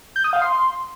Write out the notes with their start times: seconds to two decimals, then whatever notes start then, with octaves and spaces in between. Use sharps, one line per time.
0.16 G6
0.24 D#6
0.33 F5
0.42 C6